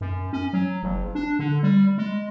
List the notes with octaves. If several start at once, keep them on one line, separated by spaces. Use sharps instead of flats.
F#2
C#4
F#3
F#1
D4
D3
G3
G#3